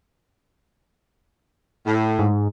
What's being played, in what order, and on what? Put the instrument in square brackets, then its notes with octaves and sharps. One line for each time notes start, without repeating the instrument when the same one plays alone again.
[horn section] A2
[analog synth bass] G#2